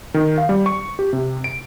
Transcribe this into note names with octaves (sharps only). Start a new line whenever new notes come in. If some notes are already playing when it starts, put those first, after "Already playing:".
D#3
F5
G3
C#6
G4
C3
D7